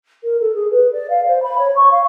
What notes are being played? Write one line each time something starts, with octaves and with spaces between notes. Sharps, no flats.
A#4
A4
G#4
B4
D5
F5
C5
B5
C#5
C#6
F5